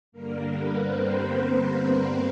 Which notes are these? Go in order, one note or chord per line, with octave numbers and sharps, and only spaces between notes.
G2 D3 G3 A#3 A#4
B3 B4
C4 C5